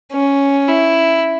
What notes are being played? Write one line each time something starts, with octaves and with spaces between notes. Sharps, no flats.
C#4
E4